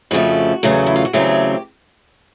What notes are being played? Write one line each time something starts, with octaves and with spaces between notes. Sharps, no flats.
F2 C#3 F3 A3 F#4
E2 C#3 F#3 A3
E4
F4
F#4
E2 C#3 F#3 A3 C4 G4